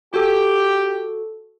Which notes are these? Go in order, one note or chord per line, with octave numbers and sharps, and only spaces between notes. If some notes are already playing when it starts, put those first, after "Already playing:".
F#4 G4 A4